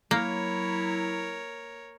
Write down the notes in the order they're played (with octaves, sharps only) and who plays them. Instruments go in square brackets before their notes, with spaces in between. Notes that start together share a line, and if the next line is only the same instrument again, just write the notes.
[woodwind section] F#3 E4 [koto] A#3 [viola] A#4 C#5